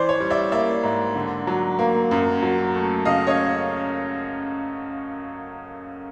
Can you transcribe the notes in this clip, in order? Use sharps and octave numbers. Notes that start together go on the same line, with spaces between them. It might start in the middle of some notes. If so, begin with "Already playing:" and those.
Already playing: E3 C5 D5
C#5
G3
D5 E5
A#3 D5 E5
G#2
D3
F#3
A#3
F#2
F#3
A3
C#3 D#5 F5
C#5 D#5